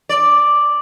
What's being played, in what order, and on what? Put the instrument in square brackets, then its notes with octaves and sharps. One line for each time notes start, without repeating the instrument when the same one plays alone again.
[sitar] D5